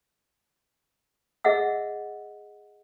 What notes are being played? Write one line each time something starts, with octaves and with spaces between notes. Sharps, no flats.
G#4 D#5 E5 F#5 E6